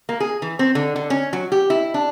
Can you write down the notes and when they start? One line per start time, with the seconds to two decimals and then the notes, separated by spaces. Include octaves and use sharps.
0.09 A#3
0.20 G#4
0.42 E3
0.59 C4
0.75 D3
0.96 D3
1.10 C#4
1.33 F#3
1.52 G4
1.70 E4
1.94 D4